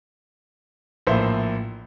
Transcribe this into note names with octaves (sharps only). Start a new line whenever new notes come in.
A#1 A2 A#3 C5 E5